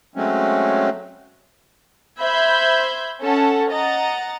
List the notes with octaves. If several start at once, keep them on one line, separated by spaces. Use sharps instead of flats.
F#3 G#3 A3 C4 C#4
C5 E5 B5 G6 G#6
C#4 A4 F#5 A5
D#5 F#5 A#5 A6